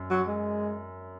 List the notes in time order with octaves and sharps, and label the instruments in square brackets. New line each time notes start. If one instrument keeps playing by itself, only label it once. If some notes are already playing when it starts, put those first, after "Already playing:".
Already playing: [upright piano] F#2
[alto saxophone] F#3
G#3